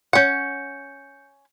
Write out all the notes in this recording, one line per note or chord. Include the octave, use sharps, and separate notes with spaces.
C#4 F#5 G6 C#7